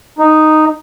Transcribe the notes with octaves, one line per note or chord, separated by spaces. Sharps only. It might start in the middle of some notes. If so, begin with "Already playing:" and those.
D#4